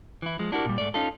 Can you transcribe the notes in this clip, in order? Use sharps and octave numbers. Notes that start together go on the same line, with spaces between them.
E3 E4
F3 G#3
D4 E4 F#4 G4 A4 A#4
A#2 G3
G#2 A3 D5
C#4 D#4 F4 A4